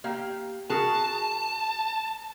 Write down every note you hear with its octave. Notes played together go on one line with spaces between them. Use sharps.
A#3 G4 F5
F#4 G#4 A#4 A5